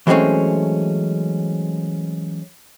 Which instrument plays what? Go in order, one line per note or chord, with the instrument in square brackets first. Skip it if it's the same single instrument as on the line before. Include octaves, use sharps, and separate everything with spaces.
[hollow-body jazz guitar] E3 F#3 G#3 A3 C4 C#4